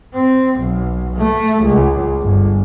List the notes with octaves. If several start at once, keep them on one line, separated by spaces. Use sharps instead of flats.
C4
B1
A3
C#2
G1